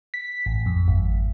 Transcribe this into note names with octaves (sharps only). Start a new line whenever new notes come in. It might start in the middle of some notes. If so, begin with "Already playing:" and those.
B6
A1
F2
G#1